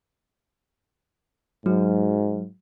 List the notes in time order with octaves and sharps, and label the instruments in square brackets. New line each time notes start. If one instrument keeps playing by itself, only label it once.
[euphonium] G#2 [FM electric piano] F#3